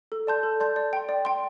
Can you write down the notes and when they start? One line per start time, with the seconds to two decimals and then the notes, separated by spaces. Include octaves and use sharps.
0.12 A4
0.27 D5 A5 C6 G6
0.43 A4
0.60 D5 A5 C6 G6
0.76 D5
0.93 G5 C6
1.09 D5
1.25 G5 C6